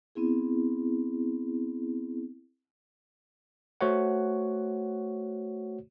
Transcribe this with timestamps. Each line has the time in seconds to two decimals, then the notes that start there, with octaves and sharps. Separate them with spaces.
0.15 B3 C4 E4 G#4
3.81 A3 F#4 C5 C#5 F#5